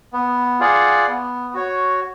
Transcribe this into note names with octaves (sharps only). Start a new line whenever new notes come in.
B3
F4 G#4 D5 F#5
B3
F#4 C#5